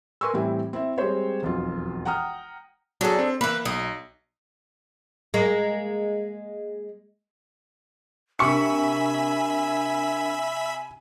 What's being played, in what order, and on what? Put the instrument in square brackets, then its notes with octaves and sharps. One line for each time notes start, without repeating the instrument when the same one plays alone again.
[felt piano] A#4 B4 G#5 C6 C#6 E6
A2 E3 G3 C4 E4 G4
C4 E4 E5
G3 G#3 C4 G4 C5 C#5
E1 B1 F2 F4
F#5 G5 A#5 D#6 F6
[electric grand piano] F#3 G#4 [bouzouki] D4 A4
[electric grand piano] C4
[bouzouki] E3 B4 [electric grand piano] A#3
[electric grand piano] B1 [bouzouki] D#5
[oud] G#3 A#3
[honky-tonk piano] C3 C#6 C#7 [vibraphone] D4 A#4 [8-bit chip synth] E5 B5 [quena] G#5